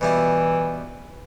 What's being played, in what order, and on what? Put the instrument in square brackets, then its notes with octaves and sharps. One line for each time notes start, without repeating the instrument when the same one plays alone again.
[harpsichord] B2 G3 E4 [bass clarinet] E3